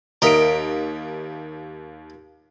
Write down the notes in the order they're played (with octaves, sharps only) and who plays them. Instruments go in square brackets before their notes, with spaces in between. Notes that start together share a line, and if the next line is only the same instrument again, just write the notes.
[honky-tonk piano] D#2 D7 [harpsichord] A#4 D#5 E5